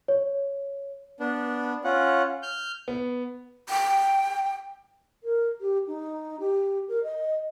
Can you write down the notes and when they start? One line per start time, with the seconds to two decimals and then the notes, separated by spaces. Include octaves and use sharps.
0.08 C#5
1.20 B3 D4
1.84 C#4 F4 F#5
2.43 F6 G6
2.88 B3
3.69 G5
5.24 A#4
5.61 G4
5.87 D#4
6.40 G4
6.88 A#4
7.04 D#5